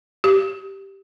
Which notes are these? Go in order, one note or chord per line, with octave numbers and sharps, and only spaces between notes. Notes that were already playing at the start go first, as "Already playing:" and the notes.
G4